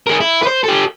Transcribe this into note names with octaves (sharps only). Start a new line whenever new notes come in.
G#4 A#4
E4
B4 C5
G4 A4